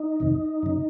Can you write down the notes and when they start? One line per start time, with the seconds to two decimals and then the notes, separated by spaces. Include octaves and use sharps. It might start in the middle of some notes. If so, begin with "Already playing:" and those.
Already playing: D#4
0.20 F2 C3 D#3
0.63 F#2 C#3